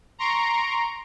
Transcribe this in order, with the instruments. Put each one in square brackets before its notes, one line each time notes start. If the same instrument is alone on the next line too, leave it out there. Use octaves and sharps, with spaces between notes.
[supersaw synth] A#5 C6 C#6 D7